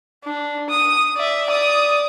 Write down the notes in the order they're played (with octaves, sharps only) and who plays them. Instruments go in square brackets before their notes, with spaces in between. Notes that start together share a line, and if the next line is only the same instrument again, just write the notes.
[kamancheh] D4
D#6
D5 E5
D5 D#6